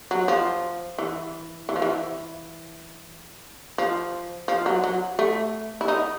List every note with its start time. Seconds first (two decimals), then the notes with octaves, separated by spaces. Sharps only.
0.11 F#3
0.28 F3
0.98 E3
1.69 E3
1.76 F3
1.82 E3
3.78 F3
4.48 F3
4.66 F#3
4.84 F#3
5.19 A3
5.81 E4
5.88 D#4